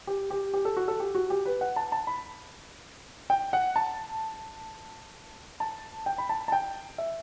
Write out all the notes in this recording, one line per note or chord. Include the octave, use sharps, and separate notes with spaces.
G4
G4
G4
A4
F#4
A4
G4
F#4
G4
B4
F#5
A5
A5
B5
G5
F#5
A5
A5
G5
B5
A5
A5
G5
E5